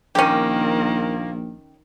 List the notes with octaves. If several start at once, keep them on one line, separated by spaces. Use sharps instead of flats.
A#1 D#3 A#3 C#4 G4